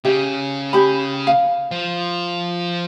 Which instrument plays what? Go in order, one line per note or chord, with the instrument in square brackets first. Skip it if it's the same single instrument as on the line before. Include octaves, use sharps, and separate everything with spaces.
[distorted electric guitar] C#3 [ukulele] G4 E5
[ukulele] G4 B5
F5
[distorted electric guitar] F3